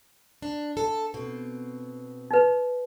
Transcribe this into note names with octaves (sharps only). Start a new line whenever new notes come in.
D4
A4
B2 C4
D#4 B4